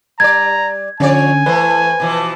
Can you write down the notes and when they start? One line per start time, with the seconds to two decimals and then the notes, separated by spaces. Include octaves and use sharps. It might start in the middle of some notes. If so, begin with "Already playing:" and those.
0.20 G3 D5 A#5 G#6
1.00 D3 F3 C#4 C#5 D5 G#5
1.46 E3 A3 B4 C5
2.00 B2 E3 F3